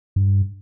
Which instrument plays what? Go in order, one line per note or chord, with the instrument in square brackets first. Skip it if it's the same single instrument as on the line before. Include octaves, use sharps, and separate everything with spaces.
[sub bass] G2